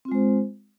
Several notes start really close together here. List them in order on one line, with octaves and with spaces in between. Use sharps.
C4 F4 G#3 C5